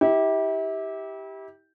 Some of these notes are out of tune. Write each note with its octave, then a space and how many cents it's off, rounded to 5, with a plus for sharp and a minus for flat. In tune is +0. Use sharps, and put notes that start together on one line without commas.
E4 -35 G4 +0